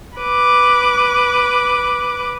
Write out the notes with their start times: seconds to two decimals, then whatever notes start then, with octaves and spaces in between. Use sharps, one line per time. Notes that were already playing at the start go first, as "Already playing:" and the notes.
0.17 B4 D6